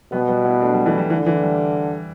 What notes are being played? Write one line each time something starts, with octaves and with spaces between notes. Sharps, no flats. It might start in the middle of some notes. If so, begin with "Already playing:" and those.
B2 G3 B3
G3 B3
B3 E4
A3 D4
G3 B3
E3 A3
G3
D3 E3
E3
G3